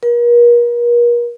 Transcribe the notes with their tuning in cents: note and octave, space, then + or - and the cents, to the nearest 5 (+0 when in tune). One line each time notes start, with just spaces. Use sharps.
A#4 +40